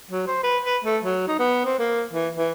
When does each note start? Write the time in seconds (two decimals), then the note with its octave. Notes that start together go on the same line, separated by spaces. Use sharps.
0.11 F#3
0.27 C5
0.43 B4
0.65 B4
0.85 A3
1.04 F#3
1.28 D#4
1.39 B3
1.66 C4
1.79 A#3
2.13 E3
2.37 E3